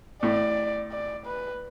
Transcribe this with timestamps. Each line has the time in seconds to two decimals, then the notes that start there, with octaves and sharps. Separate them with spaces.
0.23 A2 D5
0.92 D5
1.26 B4